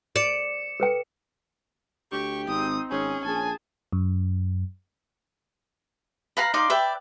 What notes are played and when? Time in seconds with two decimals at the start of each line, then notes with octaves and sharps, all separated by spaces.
0.16 D5 C#7 E7
0.80 A4 B4 G5
2.12 D2 G4 C#6
2.48 G#1 C4 D#4 D#6
2.91 G#1 C#4 G#4
3.24 A#1 G#4 G#5 A5
3.93 F#2
6.37 B4 F5 A#5 B5
6.54 D#4 D5 F5 C6
6.70 B4 D5 E5 G5